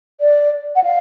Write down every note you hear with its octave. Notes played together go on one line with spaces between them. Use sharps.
D5
F#5
F5